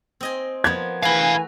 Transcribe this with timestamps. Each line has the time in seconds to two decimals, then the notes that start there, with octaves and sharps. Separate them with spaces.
0.21 C4 D#5 G#5
0.64 F3 A#3 B3 G#6
1.03 E3 A3 F#4 B4 F5 G#5 B5